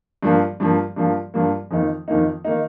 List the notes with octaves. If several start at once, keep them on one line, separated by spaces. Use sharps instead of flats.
G2 F3 A#3
G2 F3 A#3
G2 F3 A#3
G2 F3 A#3
F2 D#3 A#3 D#4
F2 D#3 A#3 D#4
D#3 A#3 D#4